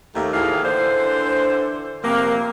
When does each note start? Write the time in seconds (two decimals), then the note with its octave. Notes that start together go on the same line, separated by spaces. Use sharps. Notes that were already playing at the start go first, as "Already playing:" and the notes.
0.14 D#2 A3
0.34 D#2 A2 E3 G#4 F5
0.64 D3 E3 D4 C5
2.04 F2 C3 A#3